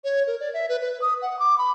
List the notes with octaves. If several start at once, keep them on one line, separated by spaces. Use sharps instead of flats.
C#5
A#4
D5
E5
B4
B4
D#6
F#5
D6
B5